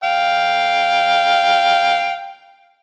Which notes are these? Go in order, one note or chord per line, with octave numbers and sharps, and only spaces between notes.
F5 G5